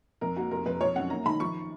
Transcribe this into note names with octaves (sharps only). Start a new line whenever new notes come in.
F2 A#4
A#3 F#4
F1 A#4
F2 B4
F3 C#5
F#2 F#5
A#3 A#5
D#3 B5
F3 C#6